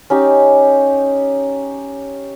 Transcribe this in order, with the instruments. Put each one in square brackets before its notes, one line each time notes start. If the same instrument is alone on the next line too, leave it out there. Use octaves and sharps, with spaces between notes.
[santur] C#4 D#4 G4